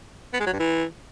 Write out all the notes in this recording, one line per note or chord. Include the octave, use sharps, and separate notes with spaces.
B3
G#3
F#3
G2
E3